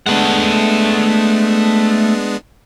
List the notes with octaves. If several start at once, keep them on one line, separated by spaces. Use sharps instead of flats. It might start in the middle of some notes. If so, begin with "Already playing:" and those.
G#3 A3 B3 D4 F#5